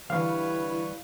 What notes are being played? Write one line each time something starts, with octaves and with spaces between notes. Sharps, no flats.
D3 E3 G3 E4 B4 C#5 F5